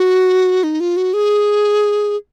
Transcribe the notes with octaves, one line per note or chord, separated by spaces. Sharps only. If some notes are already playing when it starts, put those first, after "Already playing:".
Already playing: F#4
D#4
F4
F#4
G#4